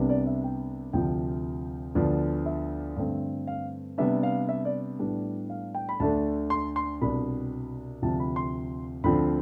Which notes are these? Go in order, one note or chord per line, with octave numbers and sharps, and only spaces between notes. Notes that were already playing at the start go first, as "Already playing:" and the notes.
Already playing: C2 C3 G3 B3 D4
D5
E5
G5
D2 C3 F3 G5
D2 D3 F3 B3 D4
E5
G2 D3 A3 C4
F5
C3 G3 B3 D4 E5
F5
E5
D5
A2 G3 B3 D4
F5
G5
B5
D2 D3 A3 D4 A5
C6
C6
C2 B2 G3 D4 B5
D2 C3 F3 A5
B5
C6
D2 D3 F3 C4 B5